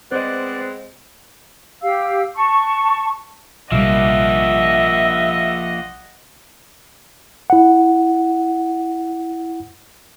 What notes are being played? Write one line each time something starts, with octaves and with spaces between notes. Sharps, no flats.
G#3 B3 C4 C5 D5 D#5 F#6
G4 F5 E6
A5 C#6
A#1 C3 F3 G3 A#3 D#5 E5 F#5
E4 F#5